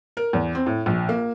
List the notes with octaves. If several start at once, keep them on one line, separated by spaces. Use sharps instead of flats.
A#4
E2
C4
A2
A#1
A#3